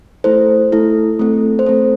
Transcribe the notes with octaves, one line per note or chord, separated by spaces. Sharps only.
A3 E4 A4 C5
A3 E4 A4
A3 C4 A4
C5
A3 C4 A4